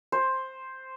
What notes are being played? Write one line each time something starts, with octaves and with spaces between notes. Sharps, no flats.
C5